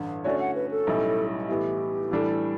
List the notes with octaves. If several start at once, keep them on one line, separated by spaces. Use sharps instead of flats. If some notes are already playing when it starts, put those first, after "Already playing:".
Already playing: A1 G2 D3
D3 A3 C#4 F#4 C#5 D5
F#5
B4
A4
B1 A2 G3 C#4 E4
A2 E3 B3 E4 G4
A2 E3 G3 D4 A4